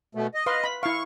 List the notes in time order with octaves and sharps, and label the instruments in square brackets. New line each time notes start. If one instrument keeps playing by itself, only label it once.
[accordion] B2 A3
D#5
[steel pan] B4 F5 C6
B5
[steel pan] E4 F5 [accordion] C#6